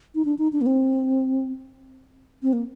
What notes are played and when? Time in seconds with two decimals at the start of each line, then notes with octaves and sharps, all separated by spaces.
0.15 D#4
0.25 D4
0.39 D#4
0.53 D4
0.61 A#3
0.66 C4
2.43 C4
2.53 A#3